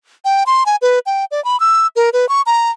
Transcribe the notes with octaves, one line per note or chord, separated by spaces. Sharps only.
G5
C6
G#5
B4
G5
D5
B5
E6
A#4
B4
C#6
A#5